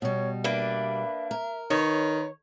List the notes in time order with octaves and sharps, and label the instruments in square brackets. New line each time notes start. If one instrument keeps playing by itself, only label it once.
[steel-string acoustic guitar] B2 G3 [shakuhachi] C#5
[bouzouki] A#3 D4 B4 [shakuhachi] E5
[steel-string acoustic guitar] A#4
[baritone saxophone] D#3 [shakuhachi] B4 [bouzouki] C#5